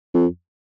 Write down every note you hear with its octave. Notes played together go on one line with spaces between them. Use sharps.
F2